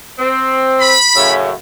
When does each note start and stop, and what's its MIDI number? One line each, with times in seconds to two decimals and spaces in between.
0.19 0.94 60
0.81 1.32 83
1.15 1.52 42
1.15 1.52 45
1.15 1.52 49